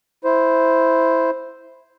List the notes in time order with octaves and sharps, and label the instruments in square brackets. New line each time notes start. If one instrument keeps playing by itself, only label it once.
[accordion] E4 C5